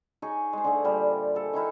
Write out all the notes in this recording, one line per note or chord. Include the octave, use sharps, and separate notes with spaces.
D#4 G#4 C#5
G#3 C5
D3 G#3 A3
A#2 G3 G4
G#4 A4
D#3 D#4 E4 A#4